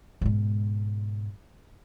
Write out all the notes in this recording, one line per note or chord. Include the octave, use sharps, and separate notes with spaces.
G#2 B2